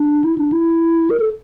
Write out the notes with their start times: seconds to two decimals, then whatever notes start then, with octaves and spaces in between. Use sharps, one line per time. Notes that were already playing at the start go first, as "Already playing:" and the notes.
Already playing: D4
0.24 E4
0.38 D4
0.52 E4
1.10 A#4
1.20 A4